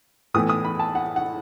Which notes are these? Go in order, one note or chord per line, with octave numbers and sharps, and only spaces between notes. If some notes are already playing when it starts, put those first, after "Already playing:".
A2 E3 B3 D#6
D#6
B5
A5
F#5
F#5